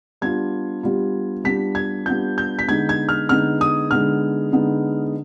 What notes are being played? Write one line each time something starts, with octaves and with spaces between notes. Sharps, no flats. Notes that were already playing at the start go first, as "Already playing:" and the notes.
G3 B3 D4 F4 G#6
G3 B3 D4 F4
G3 B3 D4 F4 B6
G#6
G3 B3 D4 F4 G6
G6
B6
D3 G#3 B3 D#4 G#6
G#6
F6
D3 G#3 B3 D#4 F6
D#6
D3 G#3 B3 D#4 F6
D3 G#3 B3 D#4